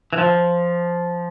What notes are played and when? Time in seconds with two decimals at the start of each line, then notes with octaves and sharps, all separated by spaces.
0.13 E3
0.18 F3